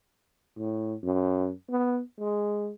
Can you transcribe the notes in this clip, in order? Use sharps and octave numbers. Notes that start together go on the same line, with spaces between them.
A2
F#2
B3
G#3